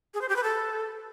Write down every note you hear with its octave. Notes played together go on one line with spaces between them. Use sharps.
G#4
C5
G4
B4
A4